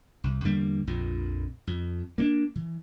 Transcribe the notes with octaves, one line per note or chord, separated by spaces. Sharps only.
C2
E2 D3 G3 A#3
A#1 F2 A#2
F2
A#3 C#4 D4
E3